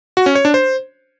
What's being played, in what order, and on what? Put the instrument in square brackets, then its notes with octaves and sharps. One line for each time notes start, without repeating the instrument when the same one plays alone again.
[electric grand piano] F#4
C#4
C#5
D4
C5